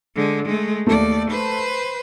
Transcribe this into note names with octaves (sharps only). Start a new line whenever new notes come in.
D3 G#3
G#3 A3
D#2 A3 D5
B4 C5